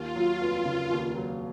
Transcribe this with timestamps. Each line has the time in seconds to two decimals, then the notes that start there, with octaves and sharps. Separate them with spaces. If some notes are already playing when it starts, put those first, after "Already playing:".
Already playing: D#2 F4
0.16 F#3
0.41 F1
0.65 C#3
0.91 D#2
1.16 F#3